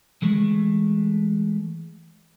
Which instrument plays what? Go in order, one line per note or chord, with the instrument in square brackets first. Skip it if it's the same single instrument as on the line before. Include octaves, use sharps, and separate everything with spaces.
[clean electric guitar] E3 G#3 A3